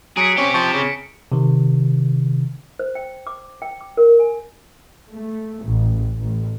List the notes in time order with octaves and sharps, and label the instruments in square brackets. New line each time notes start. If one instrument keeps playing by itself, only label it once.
[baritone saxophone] F#3 [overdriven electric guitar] G#4 [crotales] B6 C#7 D7
[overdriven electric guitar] C3 G4 [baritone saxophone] C#4
[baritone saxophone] F3 [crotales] C#6
[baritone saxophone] C#3
[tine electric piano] C3 D#3
[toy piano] C5
G5
D6
G5
D6
A#4
G#5
[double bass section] A3
A1
A1